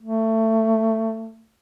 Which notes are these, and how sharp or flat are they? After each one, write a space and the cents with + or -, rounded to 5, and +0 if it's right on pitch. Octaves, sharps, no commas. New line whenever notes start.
A3 +20